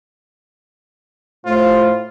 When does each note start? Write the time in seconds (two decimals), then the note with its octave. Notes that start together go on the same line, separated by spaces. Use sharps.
1.45 A2 F4 C5